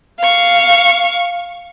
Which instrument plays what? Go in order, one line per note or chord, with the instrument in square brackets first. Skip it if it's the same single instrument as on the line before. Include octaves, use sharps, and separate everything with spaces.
[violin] F5 C#6